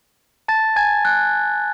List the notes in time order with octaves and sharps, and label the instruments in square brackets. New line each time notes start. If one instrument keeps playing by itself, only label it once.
[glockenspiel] A5 A6
G#5 G#6
F#6